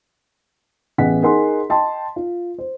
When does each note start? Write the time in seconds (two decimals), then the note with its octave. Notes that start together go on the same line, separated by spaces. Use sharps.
0.98 A1 B3 G#4 D#5 F#5 B6
1.23 D#4 G#4 A#4 F#5 C6
1.69 D#5 G5 A5 C6
2.16 F4
2.58 C5